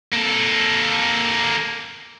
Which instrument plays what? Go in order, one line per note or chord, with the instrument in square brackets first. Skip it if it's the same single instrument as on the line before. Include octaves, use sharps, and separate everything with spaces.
[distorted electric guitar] A#3 A4